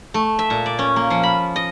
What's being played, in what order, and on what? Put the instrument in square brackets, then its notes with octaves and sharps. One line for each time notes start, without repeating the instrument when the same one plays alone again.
[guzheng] A3
E5
A#2
D5
C#4
A#3
F3
B5
D#5